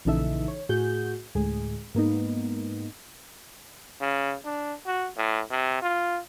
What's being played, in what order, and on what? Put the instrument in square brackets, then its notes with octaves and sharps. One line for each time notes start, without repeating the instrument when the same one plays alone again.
[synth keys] A#1 C#3 E3 D#4 A4 E5
C#5
A2 F#4 G#4 G6
D2 A2 G#3 G#4
G#2 A#3 B3 D#4
[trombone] C#3
D4
F#4
A2
C3
F4